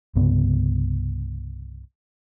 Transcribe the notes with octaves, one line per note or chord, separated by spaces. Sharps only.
C2 G2 C#3 B3